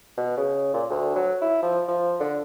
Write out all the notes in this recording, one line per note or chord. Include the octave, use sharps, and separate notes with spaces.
B2
C#3
A#2
D2
F#3
E4
F3
F3
D3